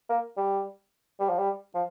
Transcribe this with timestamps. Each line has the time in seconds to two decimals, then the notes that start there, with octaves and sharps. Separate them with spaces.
0.09 A#3
0.37 G3
1.20 G3
1.29 F3
1.38 G3
1.74 F3